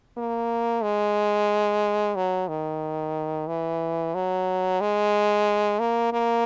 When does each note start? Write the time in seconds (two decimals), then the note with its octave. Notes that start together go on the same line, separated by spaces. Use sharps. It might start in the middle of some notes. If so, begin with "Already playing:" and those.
0.17 A#3
0.83 G#3
2.16 F#3
2.48 D#3
3.48 E3
4.14 F#3
4.81 G#3
5.80 A#3
6.13 A#3